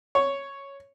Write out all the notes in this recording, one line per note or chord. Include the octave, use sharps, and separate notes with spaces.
C#5